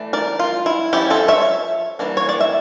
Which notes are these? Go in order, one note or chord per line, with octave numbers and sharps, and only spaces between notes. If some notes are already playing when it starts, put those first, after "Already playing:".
Already playing: E3 A3 D4
A#4 D5
F4
E4
F3 C#4 E4 G4
F4 A4
C#5 E5
E3 G3 A#3 D4
C#5
D5
E5